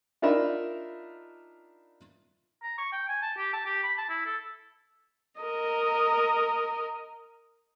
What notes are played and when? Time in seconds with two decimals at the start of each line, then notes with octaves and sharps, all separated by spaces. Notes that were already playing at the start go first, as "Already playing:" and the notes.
0.22 D4 D#4 F4 A#4 E5 B5
2.63 A#5
2.78 C#6
2.93 G5
3.08 G#5
3.22 A5
3.37 G4
3.53 A5
3.65 G4
3.83 B5
3.98 A5
4.09 E4
4.26 A4
5.40 A#4 D#5